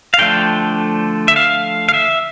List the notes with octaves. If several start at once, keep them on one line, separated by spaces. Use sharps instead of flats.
F5
D3 F3 A3 D4 G5
E5
F5
F5
E5